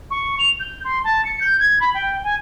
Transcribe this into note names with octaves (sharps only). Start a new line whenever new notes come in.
C#6
F7
G6
C6
A5
C#7
G6
G#6
B5
G5
G#5